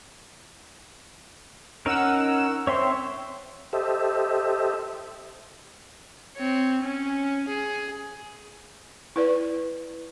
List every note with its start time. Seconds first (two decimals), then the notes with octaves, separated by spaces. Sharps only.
1.86 C#4 D#4 A#4 F#5 E6 E7
2.67 C4 C#5 E5 C6
3.73 G4 A4 C5 D#5 E5
6.37 C4 C#5
6.83 C#4
7.49 G#4
9.16 E4 B4 D5